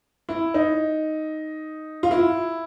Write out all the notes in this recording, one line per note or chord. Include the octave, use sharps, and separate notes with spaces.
E4
D#4
F4
E4